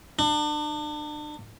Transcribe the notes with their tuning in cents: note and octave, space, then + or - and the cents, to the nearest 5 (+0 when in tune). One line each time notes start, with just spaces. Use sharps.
D4 +35